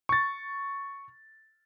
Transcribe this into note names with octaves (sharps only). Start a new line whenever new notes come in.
C#6 A6